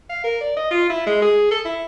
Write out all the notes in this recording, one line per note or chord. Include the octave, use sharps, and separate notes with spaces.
F5
A#4
D5
D#5
F4
E4
G#3
G#4
A4
E4